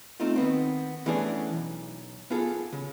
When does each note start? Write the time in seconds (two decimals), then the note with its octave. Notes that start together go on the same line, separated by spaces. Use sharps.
0.20 A3 C4 D#4 F4
0.36 D#3 B3 C4
1.06 E3 A3 B3 C#4 D4 G#4
1.53 B1
2.30 B3 F4 G#4 A4
2.72 C#3